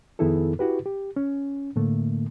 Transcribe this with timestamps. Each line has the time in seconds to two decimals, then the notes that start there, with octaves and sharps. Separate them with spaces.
0.19 F2 D#3 B3 E4 G#4 A4
0.59 E4 F#4 G4 B4
0.86 G4
1.16 C#4
1.76 A2 D3 A3 A#3